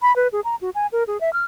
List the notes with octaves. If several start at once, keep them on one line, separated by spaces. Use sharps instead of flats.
B5
B4
G#4
A#5
F#4
G#5
A#4
G#4
E5
F6